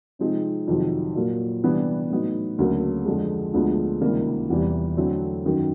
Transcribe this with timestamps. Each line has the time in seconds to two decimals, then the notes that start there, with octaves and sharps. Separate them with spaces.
0.19 C3 F3 G#3 C4 D#4
0.67 F2 C3 D#3 F#3
1.15 A#2 F#3 A#3
1.63 C3 E3 G3 B3 D4
2.10 A2 F#3 B3 D#4
2.58 D2 C#3 F#3 A#3
3.05 F2 D3 F3 G#3
3.53 D2 D3 F3 G#3 B3
4.01 C#2 C3 D#3 G3 A#3
4.50 E2 C3 E3 G3
4.97 D3 F#3 A3 C4 E4
5.45 F#2 D#3 F#3